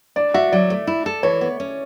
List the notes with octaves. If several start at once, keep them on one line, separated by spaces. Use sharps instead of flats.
D4 D5
F#4 E5
F#3 D5
A3
E4
A4
E3 C#5
B3
C#4